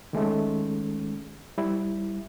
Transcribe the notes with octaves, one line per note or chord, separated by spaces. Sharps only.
D#3 G#3 A3 C#4
G3 E4